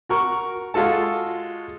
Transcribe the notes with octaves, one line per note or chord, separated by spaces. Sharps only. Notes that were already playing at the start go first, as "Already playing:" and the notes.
F#4 A#4 C#6
G#3 F4 F#4 A4 A5